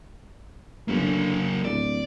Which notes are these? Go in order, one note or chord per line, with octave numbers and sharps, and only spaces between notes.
G1 F#3 A#3
D3
D1 D5